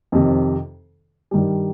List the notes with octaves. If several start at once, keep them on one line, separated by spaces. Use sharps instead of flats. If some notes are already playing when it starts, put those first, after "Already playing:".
F2 C3 D#3
G2 D#3 G3